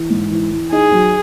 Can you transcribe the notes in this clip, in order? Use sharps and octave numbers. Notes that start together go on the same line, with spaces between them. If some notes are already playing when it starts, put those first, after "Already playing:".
Already playing: E3
G#2
E3
E3
D#4 G#4
F#3